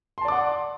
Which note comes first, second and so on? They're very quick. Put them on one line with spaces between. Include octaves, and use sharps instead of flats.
C6 A5 D5 D6 F#5